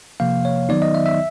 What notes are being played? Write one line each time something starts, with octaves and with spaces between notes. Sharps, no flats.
C3 F3 A#3 F5
C#5
D#3 F#3 B3 D#4 D5
D#5
E5
E5